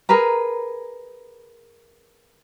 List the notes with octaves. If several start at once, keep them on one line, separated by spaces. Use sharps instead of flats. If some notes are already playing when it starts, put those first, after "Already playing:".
G#4 A#4 B4 A#5